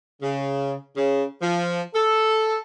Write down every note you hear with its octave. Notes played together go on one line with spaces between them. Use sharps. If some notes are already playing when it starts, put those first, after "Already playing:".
C#3
C#3
F3
A4